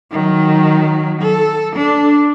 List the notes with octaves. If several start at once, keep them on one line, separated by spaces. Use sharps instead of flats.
D#3 F#3
A4
D4